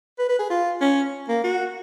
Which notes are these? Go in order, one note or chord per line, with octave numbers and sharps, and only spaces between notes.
B4
B4
G#4
F4
C#4
A#3
F#4